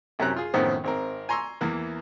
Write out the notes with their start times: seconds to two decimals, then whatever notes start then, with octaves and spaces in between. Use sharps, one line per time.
0.19 C2 F#2 C3 F#3 A#5 F#6
0.36 F4 G#4
0.54 F#2 A2 D#3 F3 B3 C4
0.84 G#1 C4 A#4
1.29 G#5 A#5 C6 C#6 E6
1.61 E2 E3 A#3